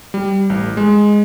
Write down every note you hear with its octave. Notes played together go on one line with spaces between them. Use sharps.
G3
A1
G#3